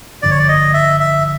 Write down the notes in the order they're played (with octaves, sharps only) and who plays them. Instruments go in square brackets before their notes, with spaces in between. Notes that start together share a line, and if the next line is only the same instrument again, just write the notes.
[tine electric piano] G#1 G2 D3 F3 [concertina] D5
[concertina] C#5
D5
D#5
E5
E5